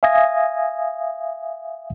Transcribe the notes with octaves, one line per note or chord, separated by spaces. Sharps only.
E5 F5 G#5 D#6 G#6 A#6